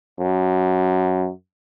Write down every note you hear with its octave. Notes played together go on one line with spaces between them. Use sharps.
F#2